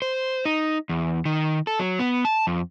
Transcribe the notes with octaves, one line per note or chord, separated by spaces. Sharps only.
C5
D#4
E2
D#3
A4
F#3
B3
A5
F2